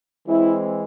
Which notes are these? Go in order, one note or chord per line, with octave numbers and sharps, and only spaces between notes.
E3 G#3 C4 E4